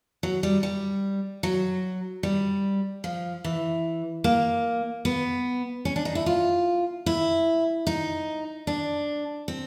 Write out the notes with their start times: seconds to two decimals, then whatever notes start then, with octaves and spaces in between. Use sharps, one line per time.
0.23 F#3
0.43 G3
0.63 G3
1.43 F#3
2.23 G3
3.04 F3
3.44 E3
4.24 A#3
5.05 B3
5.85 C#4
5.96 D4
6.05 D#4
6.15 E4
6.26 F4
7.06 E4
7.87 D#4
8.67 D4
9.48 C4